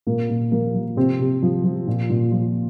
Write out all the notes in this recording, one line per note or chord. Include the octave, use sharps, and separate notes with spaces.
A#2 A#3
A#2
F3 A#3
F3
C3 C4
C3
F3
F3
A#2
A#2
F3